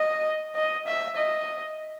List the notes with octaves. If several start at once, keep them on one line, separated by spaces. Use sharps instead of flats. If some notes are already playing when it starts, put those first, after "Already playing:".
Already playing: D#5
D#5
E5
D#5